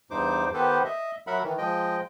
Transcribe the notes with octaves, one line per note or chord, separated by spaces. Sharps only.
E2 G2 D#4 C5 D6
D#3 B3 G4 A4 B4 C5
D#5 E5
F#3 A#4 E5 F#5 B5
D#3 E3
F3 G#3 D#5 G5